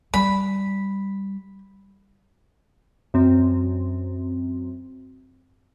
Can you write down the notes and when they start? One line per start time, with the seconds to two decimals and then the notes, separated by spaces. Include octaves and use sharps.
0.14 G3 B5
3.14 F#2 C4